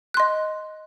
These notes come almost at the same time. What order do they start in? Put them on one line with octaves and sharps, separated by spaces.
F#6 C6 D#5